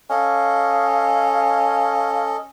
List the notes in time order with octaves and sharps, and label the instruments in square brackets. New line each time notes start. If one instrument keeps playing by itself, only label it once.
[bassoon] C#4 [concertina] A4 D#5 [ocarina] F5